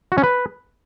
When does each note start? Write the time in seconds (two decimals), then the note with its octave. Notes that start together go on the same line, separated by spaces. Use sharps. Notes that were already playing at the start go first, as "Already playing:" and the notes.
0.12 F#4
0.18 C#4
0.23 B4